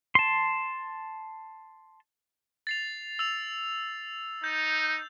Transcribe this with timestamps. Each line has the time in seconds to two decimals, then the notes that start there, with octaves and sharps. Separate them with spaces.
0.15 A5 C6
2.67 A6 C7 F7
3.19 E6 F7
4.44 D#4 G6